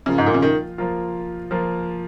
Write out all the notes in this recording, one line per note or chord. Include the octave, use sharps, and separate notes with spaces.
C#3 F3 A#3 F4
G#2
A#2
C#3
D#3
F3 A#3 F4
F3 A#3 F4